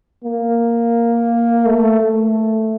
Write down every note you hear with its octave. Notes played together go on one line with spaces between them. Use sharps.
A#3
A3
A3